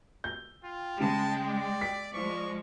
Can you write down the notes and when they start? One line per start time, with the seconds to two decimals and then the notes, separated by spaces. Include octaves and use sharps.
0.24 G6
0.64 F4 G5
1.00 C#3 G#3 A5
1.49 D5
1.81 B6
2.13 F3 G#3 D5 C#6